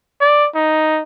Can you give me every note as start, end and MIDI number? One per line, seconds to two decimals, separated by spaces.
0.21 0.48 74
0.55 1.02 63